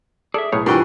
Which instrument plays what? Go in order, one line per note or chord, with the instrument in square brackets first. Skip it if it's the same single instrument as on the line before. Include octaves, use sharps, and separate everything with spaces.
[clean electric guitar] G#4 E5 [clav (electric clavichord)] A4 D5
[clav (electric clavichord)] B1 A2 C#5 [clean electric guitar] G#4
[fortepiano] G2 E3 [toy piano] F4 F#5 C#6 [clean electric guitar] A#4 C5 G5